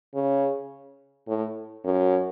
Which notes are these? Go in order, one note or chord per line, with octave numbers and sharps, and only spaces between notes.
C#3
A2
F#2